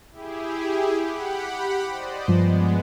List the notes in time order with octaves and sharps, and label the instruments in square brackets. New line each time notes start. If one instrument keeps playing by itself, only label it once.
[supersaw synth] E4 G4 G#4
G4 F#5 B5
C5 D5 D#5
[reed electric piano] G2 F3 [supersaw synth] G#3 B3